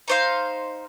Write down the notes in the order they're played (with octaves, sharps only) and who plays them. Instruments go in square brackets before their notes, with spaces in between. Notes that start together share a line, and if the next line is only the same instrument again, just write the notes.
[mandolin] D#4 C5 F5